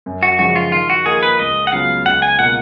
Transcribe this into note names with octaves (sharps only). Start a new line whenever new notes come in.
F#2
F#4
C#3 F3 G#3 F#4
F4
D#3 F4
F#4
A#3 F4 G#4 A#4 D#5
B4
C#2 D#5
F#5
C#3 F#3 B3 F4 F5
C#2 F#5
G#5
B2 A#3 F4 A#4 F#5